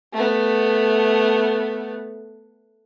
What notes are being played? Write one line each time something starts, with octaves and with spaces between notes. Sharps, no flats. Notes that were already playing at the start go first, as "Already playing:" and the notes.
A3 B3